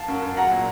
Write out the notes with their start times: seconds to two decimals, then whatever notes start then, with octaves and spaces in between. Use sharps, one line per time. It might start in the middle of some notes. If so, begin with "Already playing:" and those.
Already playing: F5 A5
0.08 F#2
0.22 F#2
0.37 F#3 F#5 A#5
0.51 A#2